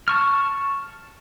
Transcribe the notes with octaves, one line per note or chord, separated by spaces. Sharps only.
A5 C#6 F6